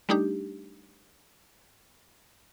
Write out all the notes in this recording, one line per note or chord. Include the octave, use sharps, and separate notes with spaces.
G3 A3 D4 D#4 G4